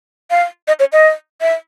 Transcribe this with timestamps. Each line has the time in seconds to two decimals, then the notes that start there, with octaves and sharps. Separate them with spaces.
0.31 F5
0.68 D#5
0.80 C#5
0.93 D#5
1.41 E5